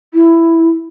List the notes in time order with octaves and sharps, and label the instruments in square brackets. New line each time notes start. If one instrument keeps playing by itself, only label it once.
[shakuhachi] E4